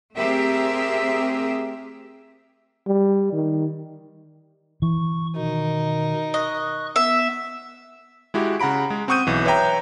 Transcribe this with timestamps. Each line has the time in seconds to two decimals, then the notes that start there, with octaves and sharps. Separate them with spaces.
0.17 A3 C4 G4 G#4 A#4 E5
2.87 G3
3.33 D#3
4.82 E3 C#6
5.37 B2 D#3 D#4 A#4
6.34 D#5 C#6 F#6
6.96 B3 E5
8.34 G#3 E4 F#4 G4
8.60 C#3 F#5 A#5 B5 D7
8.90 G#3
9.08 C4 F#5 C#6 D#6 G6 D#7
9.27 B1 E3
9.45 B4 C#5 E5 G5 A#5